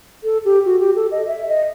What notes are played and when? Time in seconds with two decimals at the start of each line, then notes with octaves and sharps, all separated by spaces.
0.24 A4
0.45 G4
0.65 F#4
0.80 G4
0.96 A4
1.11 D#5
1.27 E5
1.48 D#5